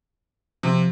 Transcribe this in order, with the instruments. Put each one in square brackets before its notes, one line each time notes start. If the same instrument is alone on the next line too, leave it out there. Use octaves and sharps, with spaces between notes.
[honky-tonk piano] C3 [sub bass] F3